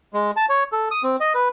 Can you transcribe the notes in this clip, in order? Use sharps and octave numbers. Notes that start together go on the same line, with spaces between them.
G#3
A5
C#5
A4
D#6
C4
D#5
B4